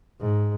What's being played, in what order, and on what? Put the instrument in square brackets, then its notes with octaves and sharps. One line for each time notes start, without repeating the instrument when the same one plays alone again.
[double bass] G#2